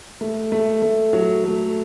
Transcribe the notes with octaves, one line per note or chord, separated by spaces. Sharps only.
A3
A3
A3
F#3
A3